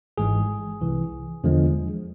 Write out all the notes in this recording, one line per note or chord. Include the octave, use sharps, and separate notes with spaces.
G#1 G#2 E3 G#3 G#4
C2 C3 E3
E2 D3 F3 G#3